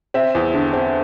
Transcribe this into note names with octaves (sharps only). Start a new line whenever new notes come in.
C4 E5
E2
D3
C4